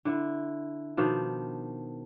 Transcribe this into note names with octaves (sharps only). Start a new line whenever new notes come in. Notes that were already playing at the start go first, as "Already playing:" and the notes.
D3 E4
B2 D#3 F3 D4